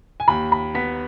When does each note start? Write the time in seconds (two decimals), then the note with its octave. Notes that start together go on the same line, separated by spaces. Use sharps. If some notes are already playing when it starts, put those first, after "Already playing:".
0.20 G#5
0.28 D#2 B5
0.52 B5
0.75 B3 B6